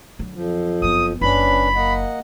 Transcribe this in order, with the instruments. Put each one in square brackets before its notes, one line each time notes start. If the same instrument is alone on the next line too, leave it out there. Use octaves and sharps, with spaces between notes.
[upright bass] D3 F#3
[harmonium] F2 F3
[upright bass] F#1 B3 [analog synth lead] D#6
[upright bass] F#1 E4 [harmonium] C#4 D4 B4 [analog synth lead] B5
[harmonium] A#3 D#5 F#5